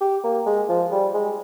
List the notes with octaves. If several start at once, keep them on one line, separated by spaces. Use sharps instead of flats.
G4
A#3
G#3
F3
G3
G#3